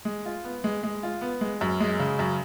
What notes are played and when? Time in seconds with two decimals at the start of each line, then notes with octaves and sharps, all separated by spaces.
0.05 G#3
0.26 F4
0.44 B3
0.64 G#3
0.83 G#3
1.03 F4
1.21 B3
1.41 G#3
1.61 F#2
1.80 G#3
1.99 C#3
2.19 F#2